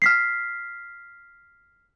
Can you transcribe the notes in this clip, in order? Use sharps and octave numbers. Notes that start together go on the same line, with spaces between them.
F6 B6 C7